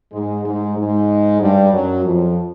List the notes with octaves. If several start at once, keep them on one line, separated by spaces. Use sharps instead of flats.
G#2 G#3
G#2 G#3
G#2 G#3
G2 G3
F#2 F#3
F2 F3